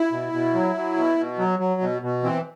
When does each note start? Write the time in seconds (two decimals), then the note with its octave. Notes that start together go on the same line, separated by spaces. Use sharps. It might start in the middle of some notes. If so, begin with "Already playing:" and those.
Already playing: E4
0.12 B2
0.33 B2
0.54 F#3
0.75 F#3
0.96 B2
1.18 B2
1.38 F#3
1.59 F#3
1.81 B2
2.02 B2
2.23 E3 C4